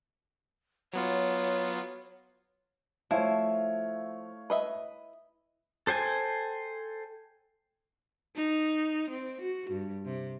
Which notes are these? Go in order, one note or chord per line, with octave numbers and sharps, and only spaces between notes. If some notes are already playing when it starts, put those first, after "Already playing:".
F#3 B3 F4 C#5
F3 A3 E4 C#5 F5
B4 D#5 E5
A4 C5 G5 G#5
D#4
C4
F#4
G2
C3